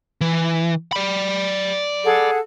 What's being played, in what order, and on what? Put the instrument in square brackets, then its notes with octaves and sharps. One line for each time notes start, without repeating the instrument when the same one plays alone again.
[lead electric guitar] E3
D5 B5
[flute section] G#4 A4 F#5